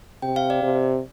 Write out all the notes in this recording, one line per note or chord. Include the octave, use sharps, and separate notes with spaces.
C3 G5
F5
D5
C3